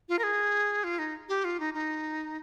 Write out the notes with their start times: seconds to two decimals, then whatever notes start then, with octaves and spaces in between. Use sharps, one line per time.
0.09 F4
0.19 A#4
0.23 G#4
0.84 F4
0.99 D#4
1.29 G4
1.44 F4
1.60 D#4
1.74 D#4